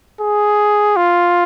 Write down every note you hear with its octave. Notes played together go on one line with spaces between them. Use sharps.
G#4
F4